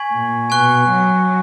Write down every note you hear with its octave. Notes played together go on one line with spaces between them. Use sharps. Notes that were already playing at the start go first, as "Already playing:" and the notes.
Already playing: G#5 C#6 G#6 B6 F#7
A#2
B2 G#5 C#6 F#6
F#3